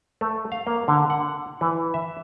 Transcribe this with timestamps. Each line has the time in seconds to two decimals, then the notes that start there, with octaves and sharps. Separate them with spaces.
0.21 A3
0.52 F5
0.67 A#3
0.88 D3
1.10 F#5
1.61 E3
1.94 E5